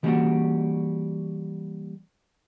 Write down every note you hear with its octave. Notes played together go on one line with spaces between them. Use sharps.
E3 G3 A#3 C#4 D4 F#4